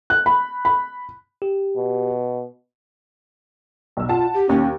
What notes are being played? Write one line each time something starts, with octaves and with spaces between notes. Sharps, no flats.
F#6
B5
B5
G4
B2
B1 E6
F4 F#5 A5
G4
D#2 C#4